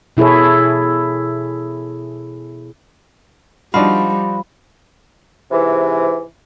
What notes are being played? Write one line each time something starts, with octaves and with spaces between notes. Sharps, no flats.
B2 E4 G#4 A4 C#5
F3 G3 D4 D#4 F#4 F5 B5
G#2 C3 E3